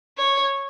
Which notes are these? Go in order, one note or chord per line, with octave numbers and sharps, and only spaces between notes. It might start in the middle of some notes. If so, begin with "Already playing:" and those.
C#5